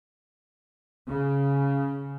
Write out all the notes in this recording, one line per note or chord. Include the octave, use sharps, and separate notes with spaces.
C#3